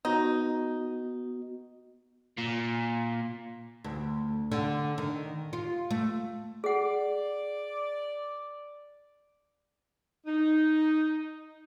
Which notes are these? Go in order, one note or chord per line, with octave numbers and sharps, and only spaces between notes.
B3 D#4 F#4 D#5
A#2
D2
D3
D#3
F4
A3
G#4 D5 F#5
D#4